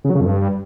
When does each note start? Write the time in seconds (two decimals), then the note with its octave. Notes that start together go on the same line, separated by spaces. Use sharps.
0.04 C#3
0.10 F#3
0.15 C#3
0.21 F2
0.26 G2